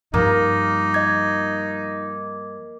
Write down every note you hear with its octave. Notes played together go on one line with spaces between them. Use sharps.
G2 F3 A#3 D#4
D#5 G#6